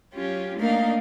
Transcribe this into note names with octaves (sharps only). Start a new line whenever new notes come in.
F#3 C#4 F4 G4
A3 A#3 D4 D#4 A#4 F5